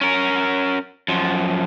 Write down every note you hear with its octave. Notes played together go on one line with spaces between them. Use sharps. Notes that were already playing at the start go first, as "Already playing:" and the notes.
C#4 A#4
F#2 F3